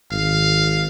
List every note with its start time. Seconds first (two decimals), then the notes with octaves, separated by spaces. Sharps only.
0.11 G#1 F5